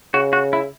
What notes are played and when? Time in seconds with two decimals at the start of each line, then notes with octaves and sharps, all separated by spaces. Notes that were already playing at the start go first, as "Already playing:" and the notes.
0.14 C#3 F#4
0.33 F#4
0.53 E4